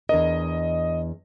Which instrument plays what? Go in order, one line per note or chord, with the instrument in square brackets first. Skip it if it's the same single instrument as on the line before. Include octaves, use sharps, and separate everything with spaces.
[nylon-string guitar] E2 D4 A#4 [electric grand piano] D#5